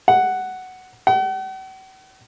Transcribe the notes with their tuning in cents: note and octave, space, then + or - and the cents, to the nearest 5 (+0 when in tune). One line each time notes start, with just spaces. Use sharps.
F#5 +5
F#5 +45